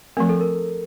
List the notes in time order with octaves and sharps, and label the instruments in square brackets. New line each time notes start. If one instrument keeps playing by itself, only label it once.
[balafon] F3 A3 C4 [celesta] A#4
[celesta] A4
A#4